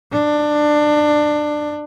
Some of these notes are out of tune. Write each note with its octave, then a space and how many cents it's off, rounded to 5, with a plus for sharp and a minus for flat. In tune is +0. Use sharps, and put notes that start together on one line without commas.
D4 +20